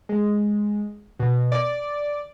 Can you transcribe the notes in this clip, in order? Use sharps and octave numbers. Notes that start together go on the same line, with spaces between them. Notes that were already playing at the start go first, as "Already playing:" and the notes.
G#3
B2
D5